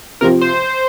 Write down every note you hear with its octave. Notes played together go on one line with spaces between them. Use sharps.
C3 F3 C4 F4 A#4
C5